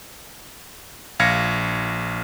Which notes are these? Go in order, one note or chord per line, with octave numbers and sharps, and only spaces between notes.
A#1 F5 F6 G#6 A#6 C#7